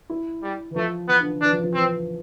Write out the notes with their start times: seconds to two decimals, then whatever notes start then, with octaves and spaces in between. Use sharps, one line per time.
0.10 E4
0.43 G3
0.71 E3
0.76 F3 A3
1.08 E3 B3
1.20 D3
1.30 D3
1.41 E3 D4
1.53 F3
1.63 F3
1.74 E3 C4